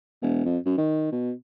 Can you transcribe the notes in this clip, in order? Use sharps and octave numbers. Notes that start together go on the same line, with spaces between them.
E1
F2
F#2
D#3
B2